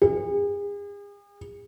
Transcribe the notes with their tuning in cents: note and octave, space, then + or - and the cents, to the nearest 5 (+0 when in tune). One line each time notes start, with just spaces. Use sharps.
G#4 -40